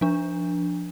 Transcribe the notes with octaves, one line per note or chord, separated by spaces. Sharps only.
F3 D4